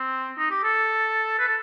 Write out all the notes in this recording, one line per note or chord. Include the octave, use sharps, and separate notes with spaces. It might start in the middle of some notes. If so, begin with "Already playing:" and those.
Already playing: C4
D#4
G4
A4
B4
A4